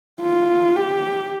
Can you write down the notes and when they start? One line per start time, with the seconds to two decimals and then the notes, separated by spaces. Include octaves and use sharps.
0.22 F4
0.76 G4